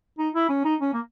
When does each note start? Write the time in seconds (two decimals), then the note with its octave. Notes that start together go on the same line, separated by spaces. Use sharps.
0.19 D#4
0.34 E4
0.49 C#4
0.64 D#4
0.80 C#4
0.93 A#3